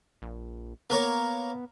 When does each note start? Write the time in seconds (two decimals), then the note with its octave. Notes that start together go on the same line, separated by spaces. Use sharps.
0.22 A#1
0.90 A#3 B3 A#4 C#5